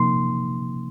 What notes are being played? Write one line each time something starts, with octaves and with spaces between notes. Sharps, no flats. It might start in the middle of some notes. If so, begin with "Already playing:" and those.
Already playing: C3 F3 A#3 D#4 C6